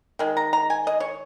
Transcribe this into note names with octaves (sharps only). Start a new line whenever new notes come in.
D#3 G#3
A#5
A#5
G#5
D#5
C#5